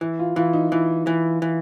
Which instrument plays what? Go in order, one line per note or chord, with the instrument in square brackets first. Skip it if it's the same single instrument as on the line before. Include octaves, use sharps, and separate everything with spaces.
[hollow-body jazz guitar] E3 [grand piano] E4
[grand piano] F4
[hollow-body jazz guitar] E3 [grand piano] F4
[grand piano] D#4
[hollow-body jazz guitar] E3 [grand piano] E4
[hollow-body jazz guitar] E3
E3